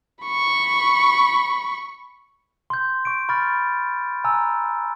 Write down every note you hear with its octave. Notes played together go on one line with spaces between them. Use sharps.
B5 C#6
C6 G6
C#6 D7
B5 C#6 F6 A6
G#5 A#5 E6